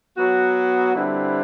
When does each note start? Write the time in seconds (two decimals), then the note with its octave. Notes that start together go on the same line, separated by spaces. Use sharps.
0.17 F#3 B3 F#4
0.95 D3 G3 C4 E4 B4